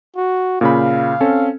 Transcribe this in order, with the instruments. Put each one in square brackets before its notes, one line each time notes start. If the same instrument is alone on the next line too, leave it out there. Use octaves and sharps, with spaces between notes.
[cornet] F#4
[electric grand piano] A#2 C#3 B5 [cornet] F5
[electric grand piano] C4 C#4 A4